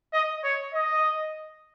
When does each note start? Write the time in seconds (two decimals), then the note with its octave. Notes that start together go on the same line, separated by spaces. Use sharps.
0.13 D#5
0.44 C#5
0.73 D#5